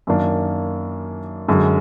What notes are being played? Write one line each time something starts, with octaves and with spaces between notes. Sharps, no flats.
F#2 D#3 A#3 D4
F#2 D3 G#3